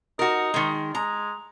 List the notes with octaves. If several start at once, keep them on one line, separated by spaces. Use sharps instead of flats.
D#4 F#4 A#4
D#3 G#3
G#3 A#5